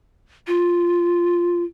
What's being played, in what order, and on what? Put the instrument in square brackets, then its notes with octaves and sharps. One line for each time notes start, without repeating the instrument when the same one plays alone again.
[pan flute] F4